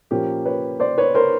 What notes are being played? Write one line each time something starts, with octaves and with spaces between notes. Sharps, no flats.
A#2 F3 A#3 C#4 G4
B4 C#5
C5 D5
B4 C#5
A#4 C5